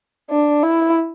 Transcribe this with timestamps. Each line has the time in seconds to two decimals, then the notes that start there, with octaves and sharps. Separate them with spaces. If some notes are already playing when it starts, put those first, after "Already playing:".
0.31 D4
0.63 E4